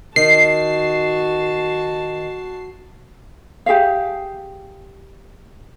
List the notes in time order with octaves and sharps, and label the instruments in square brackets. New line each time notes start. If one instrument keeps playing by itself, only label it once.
[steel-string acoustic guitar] D#3 [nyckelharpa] F#4 A5 [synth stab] C7
[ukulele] G4 G#4 E5 F5